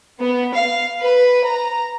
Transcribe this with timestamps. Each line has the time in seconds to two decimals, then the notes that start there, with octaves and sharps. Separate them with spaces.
0.20 B3
0.54 F5
1.01 B4
1.44 A#5